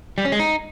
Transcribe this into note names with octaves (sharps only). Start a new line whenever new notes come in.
G3
C#4
G#3
D#4